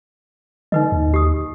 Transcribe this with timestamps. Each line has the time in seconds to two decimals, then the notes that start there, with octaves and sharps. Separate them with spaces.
0.72 D3 D#4 B4 D#5
0.92 D#2
1.14 G4 D#6